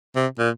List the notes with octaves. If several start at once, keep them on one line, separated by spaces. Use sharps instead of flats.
C3
A#2